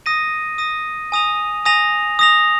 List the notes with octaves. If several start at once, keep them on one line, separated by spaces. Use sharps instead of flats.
D#6 A#6 D#7
D#6 A#6 D#7
G#5 D#6 A#6 F7
G#5 D#6 A#6 F7
D#6 A#6 F7